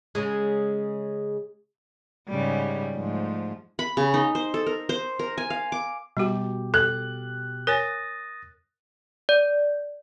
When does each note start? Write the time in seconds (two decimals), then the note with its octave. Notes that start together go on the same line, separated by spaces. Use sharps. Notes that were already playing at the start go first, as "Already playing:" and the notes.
0.15 C#3 G#3
2.29 G#2 C#3 G3
2.95 G#2 F3 A3
3.79 B5
3.97 C#3
4.14 D#4
4.35 C5
4.54 A4
4.66 A#4
4.89 C5
5.19 A#4
5.38 G#5
5.50 F5
5.72 D6
6.17 B2 G3 F#4 G4
6.74 A4 F#6
7.67 A#4 C#5 G#5 D#6 A6 A#6
9.29 D5